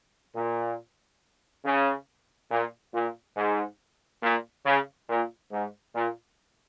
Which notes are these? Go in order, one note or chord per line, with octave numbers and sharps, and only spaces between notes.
A#2
C#3
A#2
A#2
G#2
A#2
C#3
A#2
G#2
A#2